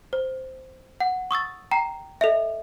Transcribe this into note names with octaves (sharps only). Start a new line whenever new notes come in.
C5
F#5
C#6 D#6 E6 A6
G5 A#5 C7
A4 D#5 E5